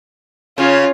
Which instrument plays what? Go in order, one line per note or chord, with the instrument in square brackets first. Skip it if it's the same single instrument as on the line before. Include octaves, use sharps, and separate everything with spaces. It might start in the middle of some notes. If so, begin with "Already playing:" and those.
[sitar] C#3 [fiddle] C#4 F4